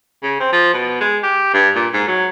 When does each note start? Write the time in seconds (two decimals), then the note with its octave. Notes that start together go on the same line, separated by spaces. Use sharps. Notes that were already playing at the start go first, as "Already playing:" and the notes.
0.23 C#3
0.40 C4
0.52 F3
0.74 B2
1.00 G#3
1.23 G4
1.53 G2
1.76 A#2
1.93 G#2
2.07 F#3